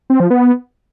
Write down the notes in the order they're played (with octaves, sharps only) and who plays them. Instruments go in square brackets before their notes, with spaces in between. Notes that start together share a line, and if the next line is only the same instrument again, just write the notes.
[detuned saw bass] C4
F3
B3